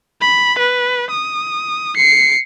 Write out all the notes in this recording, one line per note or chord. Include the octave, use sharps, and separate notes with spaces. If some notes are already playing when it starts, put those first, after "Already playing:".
B5
B4
D#6
C7 C#7